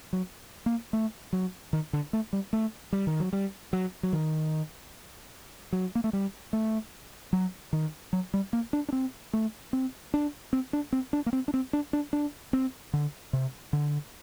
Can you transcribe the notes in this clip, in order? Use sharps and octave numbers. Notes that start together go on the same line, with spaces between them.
F#3
A#3
A3
F#3
D#3
D3
A3
G3
A3
G3
D#3
F#3
G3
F#3
F#3
D#3
F#3
A#3
A3
G3
A3
F#3
D#3
F#3
G3
A#3
D4
D4
C4
A3
C4
D4
C4
D4
C4
D4
A#3
C4
D4
C4
D4
D4
D4
C4
D3
C3
D3